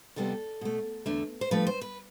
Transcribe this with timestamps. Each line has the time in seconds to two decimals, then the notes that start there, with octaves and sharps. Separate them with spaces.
0.16 F2 C3 G3 B3 A4
0.61 B2 A3
1.06 E2 D3 A3
1.41 C5
1.51 G2 F3 A3 B4
1.67 C5
1.81 B4